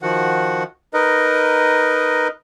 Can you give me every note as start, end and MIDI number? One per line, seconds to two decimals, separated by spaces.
0.02 0.63 51
0.02 0.63 53
0.02 0.63 66
0.02 0.63 78
0.94 2.28 63
0.94 2.28 70
0.94 2.28 71
0.94 2.28 75